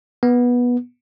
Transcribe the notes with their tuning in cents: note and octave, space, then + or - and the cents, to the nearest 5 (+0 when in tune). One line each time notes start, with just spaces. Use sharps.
B3 -15